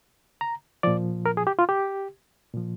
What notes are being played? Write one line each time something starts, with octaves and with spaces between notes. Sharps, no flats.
A#5
A#2 F3 D5
A#4
G#4
G4
F4
G4
A#2 F3